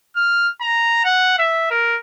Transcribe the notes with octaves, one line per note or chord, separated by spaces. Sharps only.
F6
A#5
F#5
E5
A#4